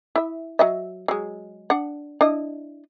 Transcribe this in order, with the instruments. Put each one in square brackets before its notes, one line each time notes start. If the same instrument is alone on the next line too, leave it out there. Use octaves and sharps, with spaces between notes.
[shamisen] E4 E5
F#3 D#5 E5
F#3 G#3
D4 F#5
D4 E4 D#5